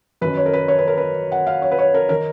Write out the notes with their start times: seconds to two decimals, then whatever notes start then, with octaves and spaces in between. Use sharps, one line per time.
0.21 F#2 D#3 B4
0.37 C#5
0.46 A#4
0.53 B4
0.68 C#5
0.79 B4
0.88 A#4
0.97 B4
1.32 F#5
1.47 F5
1.62 C#5
1.72 B4
1.79 C#5
1.94 A#4
2.09 D#3 A#4